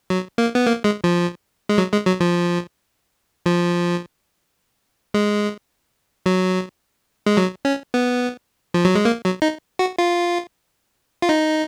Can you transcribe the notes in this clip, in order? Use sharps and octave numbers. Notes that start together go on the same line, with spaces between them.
F#3
A#3
B3
A#3
G#3
F3
G#3
F#3
G#3
F#3
F3
F3
G#3
F#3
G#3
F#3
C#4
B3
F3
F#3
G#3
A#3
F#3
D#4
F#4
F4
F4
D#4